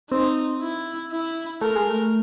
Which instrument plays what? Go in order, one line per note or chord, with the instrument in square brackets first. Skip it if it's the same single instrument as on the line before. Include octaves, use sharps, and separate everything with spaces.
[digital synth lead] C4 [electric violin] D#4
[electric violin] E4
E4
[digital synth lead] A3 [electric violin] A#4
[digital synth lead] G#3
A3